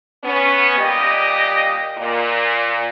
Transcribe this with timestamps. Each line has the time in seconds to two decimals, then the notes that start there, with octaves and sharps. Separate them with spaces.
0.24 B3 C#4
0.79 A#2 G3 G4 D#5
1.98 A#2